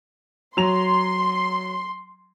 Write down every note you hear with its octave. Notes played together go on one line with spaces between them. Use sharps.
F#3 A#5 C6 F7